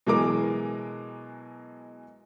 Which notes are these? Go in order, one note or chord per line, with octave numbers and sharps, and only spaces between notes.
B2 E3 F#3 G#3 A#4 D6